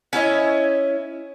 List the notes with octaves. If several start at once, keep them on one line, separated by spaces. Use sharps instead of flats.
C#4 E4 C#5 D#5